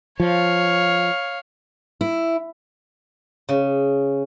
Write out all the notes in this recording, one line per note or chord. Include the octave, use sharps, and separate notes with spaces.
F3 C#5 F5
E4
C#3